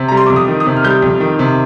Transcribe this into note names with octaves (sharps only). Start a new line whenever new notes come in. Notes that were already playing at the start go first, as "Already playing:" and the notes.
Already playing: C3
G3 A#5
C6
F2 D6
D#6
D#3
D#6
C3
F6
G3 G6
F2
D#3
C3